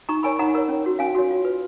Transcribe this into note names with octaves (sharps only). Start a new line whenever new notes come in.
D#4 A#5 C#6
A#4 C#5 G#5 B5
D#4 F#5 A#5
A#4 C#5
C#4
F#4 C#5
C#4 F5 G#5
F#4 C#5
F4
B4